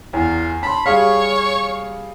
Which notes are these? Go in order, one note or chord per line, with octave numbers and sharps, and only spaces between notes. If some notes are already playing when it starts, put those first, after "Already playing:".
E2 F4
A5 B5 C6
G3 G#4 C#5 F5